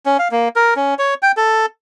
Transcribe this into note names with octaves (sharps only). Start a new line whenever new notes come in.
C#4
F5
A#3
A#4
C#4
C#5
G5
A4